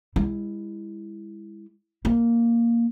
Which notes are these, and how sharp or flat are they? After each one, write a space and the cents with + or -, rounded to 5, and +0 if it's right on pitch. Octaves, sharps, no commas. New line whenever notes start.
G#3 -40 E4 +0
A#3 +0 D4 +0